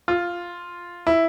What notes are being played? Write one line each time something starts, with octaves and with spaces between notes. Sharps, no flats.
F4
E4